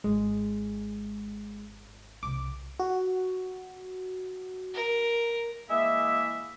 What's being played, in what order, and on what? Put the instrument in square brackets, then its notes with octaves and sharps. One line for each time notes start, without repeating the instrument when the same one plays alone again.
[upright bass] G#1 [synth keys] G#3
[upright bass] C2 C3 [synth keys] D6
[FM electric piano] F#4
[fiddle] A#4
[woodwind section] E3 G#3 A#3 E5